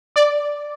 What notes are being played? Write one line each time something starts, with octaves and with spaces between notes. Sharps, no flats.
D5